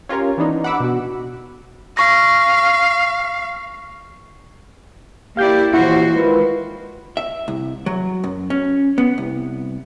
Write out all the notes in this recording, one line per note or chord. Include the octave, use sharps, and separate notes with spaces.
C#4 F4 G4 A#4 C#5
E3 B3 D4 D#4
F#5 B5 D6 E6
B2 F#4
F5 C#6 A#6
A#3 E4 G4 D5 F5 G6
D#2 A#2 E3 E4 F#4 C5 F#5
D#3 G#3 F4 B4
E5
C2
F#3
F#2
C#4
B3
C2